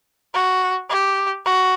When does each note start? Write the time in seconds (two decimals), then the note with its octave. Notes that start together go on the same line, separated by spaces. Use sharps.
0.34 F#4
0.89 G4
1.46 F#4